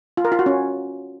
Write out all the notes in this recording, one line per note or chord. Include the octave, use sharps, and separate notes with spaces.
F4
A#4
F4
F#4
C#4